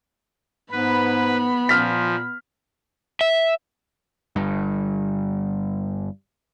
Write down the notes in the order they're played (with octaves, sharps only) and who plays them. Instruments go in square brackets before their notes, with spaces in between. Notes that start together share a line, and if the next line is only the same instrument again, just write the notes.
[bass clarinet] G#2 [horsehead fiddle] B3 B5 [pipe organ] B4
[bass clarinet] A#2 [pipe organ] F3 [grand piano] F6 B6
[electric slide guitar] E5
[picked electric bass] G1 G2